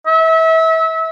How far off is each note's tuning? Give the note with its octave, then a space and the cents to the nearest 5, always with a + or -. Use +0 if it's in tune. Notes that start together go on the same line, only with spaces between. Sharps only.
E5 -30